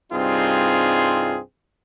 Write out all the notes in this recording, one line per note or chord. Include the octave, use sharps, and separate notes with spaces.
C2 G2 C4 D#4 F4 G#4